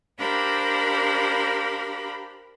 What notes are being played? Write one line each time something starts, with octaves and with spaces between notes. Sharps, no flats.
D4 G4 A#4 C5 F5 B5